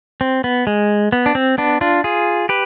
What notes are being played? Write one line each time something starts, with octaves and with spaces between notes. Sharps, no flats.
C4
B3
G#3
B3
D4
C4
B3 D4
D4 F4
F4 G#4
G4 B4